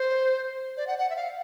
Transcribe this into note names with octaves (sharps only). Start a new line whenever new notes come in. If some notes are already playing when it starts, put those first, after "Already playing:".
Already playing: C5
D5
F#5
F#5
E5
F5